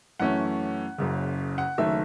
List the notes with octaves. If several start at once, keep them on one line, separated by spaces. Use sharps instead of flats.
F#2 E3 A3 C#4 F#5
F#1 F#2 C#3
F#5
F#1 F#2 D#3 A3 E5